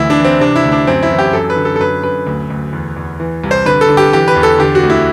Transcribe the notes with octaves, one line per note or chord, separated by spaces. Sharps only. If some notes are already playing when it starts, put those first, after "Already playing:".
Already playing: D2 E3 E4
D4
E3
C4
C3 D4
E4
D2
D4
F#2 C4
E4
E3
G4
F#2 A4
B4
D3
A4
A4
F#2 B4
F#2 B4
D2
D2
E2
E2
E3
C2
C5
D3 B4
A4
D3
G4
E3 G4
B4
E2
A4
D3 G4
F#4
D2
E4